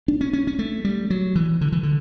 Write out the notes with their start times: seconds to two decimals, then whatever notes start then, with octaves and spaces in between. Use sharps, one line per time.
0.08 D4
0.21 C#4
0.33 C#4
0.47 C#4
0.59 A3
0.85 G3
1.10 F#3
1.35 E3
1.61 D3
1.72 E3
1.83 D3